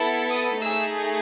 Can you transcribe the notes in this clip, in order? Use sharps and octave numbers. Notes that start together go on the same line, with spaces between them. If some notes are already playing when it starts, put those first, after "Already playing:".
Already playing: B3 E4 A4
D#6
A3 D#4 G#4 E6